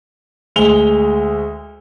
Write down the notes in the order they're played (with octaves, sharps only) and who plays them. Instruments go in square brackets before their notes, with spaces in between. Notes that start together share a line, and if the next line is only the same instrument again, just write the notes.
[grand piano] D2 G#3 F7 G7